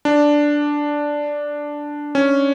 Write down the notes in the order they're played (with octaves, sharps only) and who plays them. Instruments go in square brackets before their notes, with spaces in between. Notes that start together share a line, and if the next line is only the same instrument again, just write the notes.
[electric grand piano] D4
C#4